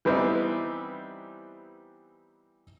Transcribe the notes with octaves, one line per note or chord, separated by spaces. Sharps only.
E3 G3 B3 C4 D#4 E4